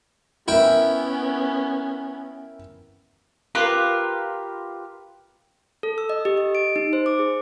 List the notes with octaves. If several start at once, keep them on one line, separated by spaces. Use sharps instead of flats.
B3 C#4 E4 A#4 E5 G5
F4 G4 A#4 B4
A4
E6
D#5
G4
D#5
D7
D#4
C5
D6
G#4